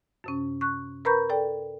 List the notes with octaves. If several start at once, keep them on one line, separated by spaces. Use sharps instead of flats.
F#2 C3 C#4
C#6 F#6
A#4 B4 A#5 B5 C#6 G6
A4 D5 G5